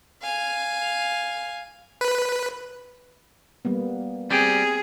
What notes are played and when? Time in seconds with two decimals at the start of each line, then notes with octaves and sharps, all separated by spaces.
0.22 F5 G#5
2.01 B4
3.65 G3 A#3 B3
4.31 G3 C4 G4 G#4 G5